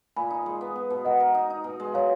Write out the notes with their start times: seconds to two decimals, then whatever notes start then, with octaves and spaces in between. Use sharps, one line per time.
0.16 A#2 G#5 B5
0.30 D#4
0.46 G#3
0.61 B3
0.76 B3
0.90 B2
1.05 A#4 D#5 F#5
1.20 A#4
1.35 D#4
1.50 D#4
1.64 B2
1.80 G#3
1.94 F#3 C#5 F5